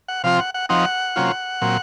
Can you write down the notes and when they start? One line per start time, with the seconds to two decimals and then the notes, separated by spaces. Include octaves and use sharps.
0.08 F#5
0.24 C3 F3 C4 F4 F5
0.40 F#5
0.54 F#5
0.69 F3 C4 D#4 F#5
1.16 C3 F#3 A#3 C#4 F4
1.62 A#2 F#3 C4